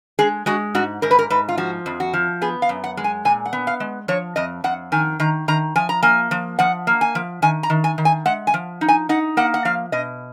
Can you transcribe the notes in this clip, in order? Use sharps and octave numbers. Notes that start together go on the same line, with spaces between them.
G#3 G#4
G#3 F#4
G#2 F#4
G#2 A#4
B4
A#4
G#2 B4
F4
F3 F#4
F2
F#4
F3
B3 G#4
F5
F#2
F#5
G#3
G#5
A#2 G#5
F#5
B3
F5
G#3
F3 C#5
F2 D#5
F2 F#5
D#3 G#5
D#3 A#5
D#3 A#5
F3 G#5
A#5
A#3 G#5
F3
F3 F#5
A#3
G#5
F3
D#3 G#5
A#5
D#3
G#5
D#3
G#5
G#3 F#5
G#5
F3
D#4
G#5
D#4 F#5
A#3 F#5
F#5
F3 F5
B2 D#5